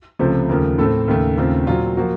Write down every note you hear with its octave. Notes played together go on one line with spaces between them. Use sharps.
C#2 C3 F3 A3 C5
D#2 C#3 F3 A3 A#4
A2 A3 C4 A4
D#2 C#3 A3
D#2 C#3 A3 C4 F4
A#2 F#3 C4 F4
F3 A#3 F#4